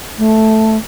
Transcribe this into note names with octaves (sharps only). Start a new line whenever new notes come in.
A3